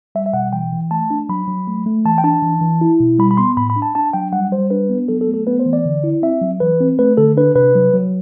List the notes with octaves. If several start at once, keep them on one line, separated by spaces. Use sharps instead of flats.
G3 E5
E5
B2 F#5
E3 G5
E3
A3 A5
D4
F#3 B5
F#3
A3
A3
E3 A5
G5
D4 A5
E3
E3
E4
B2
G3 B5
B5
B3 C6
A2 B5
B5
D4
A5
D4 A5
F#3 G5
G3 F#5
G3 C5
D4 B4
B3
F#3 A4
A4
A3
A4
B3 B4
C5
E3
D5
D3
E4
C4 E5
F#3
E3 B4
C4
A3 B4
D3 A4
D4 B4
C3 B4
F#3
F#3